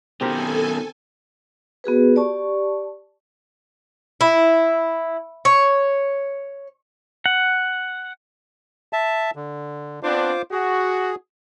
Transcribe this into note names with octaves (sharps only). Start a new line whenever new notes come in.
B2 D#3 C4 G4 A4 A#4 G#5
B3 F#4 G#4 B4
G4 D5 A5 C#6
E4
C#5
F#5
E5 A5
D3
B3 C4 D4 F4 C5 D6
F#4 G#4